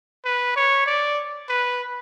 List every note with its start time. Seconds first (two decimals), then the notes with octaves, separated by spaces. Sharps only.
0.25 B4
0.56 C#5
0.87 D5
1.49 B4